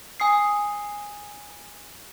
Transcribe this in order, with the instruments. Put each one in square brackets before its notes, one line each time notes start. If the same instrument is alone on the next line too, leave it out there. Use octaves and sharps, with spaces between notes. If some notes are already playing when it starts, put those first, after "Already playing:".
[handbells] G#5 D#6 C7